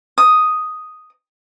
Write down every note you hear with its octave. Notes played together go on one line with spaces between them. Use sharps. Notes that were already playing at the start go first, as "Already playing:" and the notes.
D#6